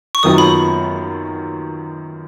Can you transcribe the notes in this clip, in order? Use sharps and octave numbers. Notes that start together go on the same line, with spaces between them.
C#6
F#2 D#3 F#3 B3 F4 D#6
B5